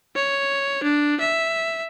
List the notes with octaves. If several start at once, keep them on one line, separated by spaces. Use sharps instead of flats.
C#5
D4
E5